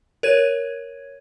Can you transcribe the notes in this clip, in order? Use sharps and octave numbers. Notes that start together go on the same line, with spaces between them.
A#4 C#5 G#6 D#7